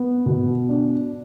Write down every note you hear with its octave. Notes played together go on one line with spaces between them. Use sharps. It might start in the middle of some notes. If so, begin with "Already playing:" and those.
Already playing: B3
B2
D4